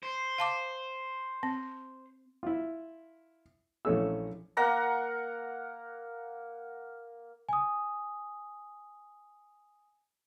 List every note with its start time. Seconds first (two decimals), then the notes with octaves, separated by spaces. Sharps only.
0.03 C5
0.38 F5 A5 D6
1.43 C4
2.43 E4 F4
3.85 A#1 E3 A3 C#4 A4 E6
4.57 A#3 A#4 F#5 A#5
7.49 G#5 D#6